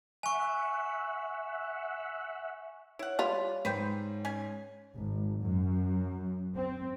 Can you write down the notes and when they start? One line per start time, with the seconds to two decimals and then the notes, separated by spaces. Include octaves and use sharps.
0.23 E5 F#5 G#5 C#6
2.99 E4 C#5 F#5
3.19 G3 F4 B4
3.65 G#2 B4 C5 G5
4.25 C#4 G#5
4.95 G#1
5.40 F#2
6.54 C4